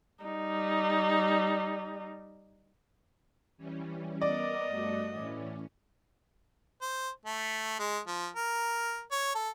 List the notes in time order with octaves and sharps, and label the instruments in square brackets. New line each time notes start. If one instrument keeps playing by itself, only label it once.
[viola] G3 D#4
[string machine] E3 G3 C#4
[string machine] B3 A#4 [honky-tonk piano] D5 [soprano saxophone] D#5
[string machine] G2 A3 F#4
A2 E3 C#4
[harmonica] C5
A3
G#3
F3
A#4
C#5
A4